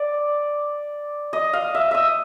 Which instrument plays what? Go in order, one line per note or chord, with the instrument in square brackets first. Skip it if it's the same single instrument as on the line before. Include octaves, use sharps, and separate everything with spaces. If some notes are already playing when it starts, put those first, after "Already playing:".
Already playing: [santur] D5
D#5
F5
E5
D#5 E5